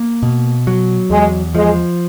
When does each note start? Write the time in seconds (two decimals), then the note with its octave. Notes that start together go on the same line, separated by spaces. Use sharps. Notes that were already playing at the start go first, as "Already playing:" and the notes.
Already playing: A#3
0.23 B2
0.67 F#3
1.10 E2 G#3
1.55 F3 G#3